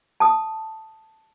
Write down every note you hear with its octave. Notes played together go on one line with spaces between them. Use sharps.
A5 D#6